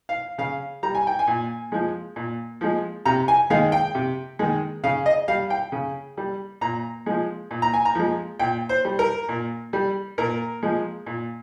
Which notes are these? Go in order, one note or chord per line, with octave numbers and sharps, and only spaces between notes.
F5
C#3 F5
G3 A#5
G#5
G5
G#5
A#2
F3 G#3
A#2
F3 G#3
C3 A#5
G#5
D#3 G#3 F5
G5
C3
D#3 G#3
C#3 F5
D#5
G3 F5
G5
C#3
G3
A#2 A#5
F3 G#3
A#2
A#5
G#5
A#5
F3 G#3
A#2 G5
C5
G3
A#4
A#2
G3
A#2 A#4
F3 G#3
A#2